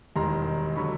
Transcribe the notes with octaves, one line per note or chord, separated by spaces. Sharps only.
E1 D#2 D#3 G3 A#5 C6
D3 F#3 B5 C#6